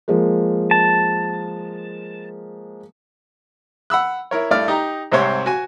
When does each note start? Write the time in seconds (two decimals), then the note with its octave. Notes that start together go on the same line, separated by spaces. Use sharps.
0.08 F3 G#3 A#3
0.71 A5
3.90 F#5 B5 E6 F#6
4.31 E4 A#4 C#5
4.51 G2 A3 E4 D5 F6
4.68 D#4 G4 A#5
5.12 C2 G#2 C3 C4 C5 C#5
5.46 F#4 G#5